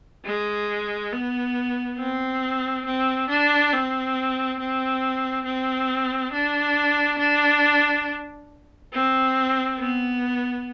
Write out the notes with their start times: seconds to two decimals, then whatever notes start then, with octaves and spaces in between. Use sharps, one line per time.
0.25 G#3
1.12 B3
1.98 C4
2.85 C4
3.29 D4
3.73 C4
4.60 C4
5.45 C4
6.33 D4
7.19 D4
8.93 C4
9.79 B3